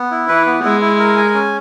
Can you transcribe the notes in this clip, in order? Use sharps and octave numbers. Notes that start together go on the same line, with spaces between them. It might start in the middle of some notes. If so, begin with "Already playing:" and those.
Already playing: B3
E4
E3 B4
B3
G#3 E4
E4
A#4
G#5
C#4